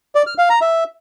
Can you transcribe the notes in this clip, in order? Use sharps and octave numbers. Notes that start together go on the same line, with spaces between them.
D5
F6
F5
A#5
E5